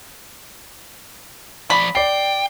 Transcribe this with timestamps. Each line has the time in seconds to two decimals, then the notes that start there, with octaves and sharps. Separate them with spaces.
1.70 F3 D5 B5
1.95 D5 G5 C7